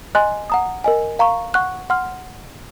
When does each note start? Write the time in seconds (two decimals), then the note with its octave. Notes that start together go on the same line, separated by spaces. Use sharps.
0.15 D#5 G#5 C6 F#6
0.50 F#5 A#5 D#6
0.84 A#4 D#5 G#5
1.19 F5 A#5 C#6
1.54 F#5 C#6 F#6
1.90 F#5 C6 F6